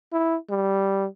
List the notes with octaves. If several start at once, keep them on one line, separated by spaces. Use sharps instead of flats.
E4
G3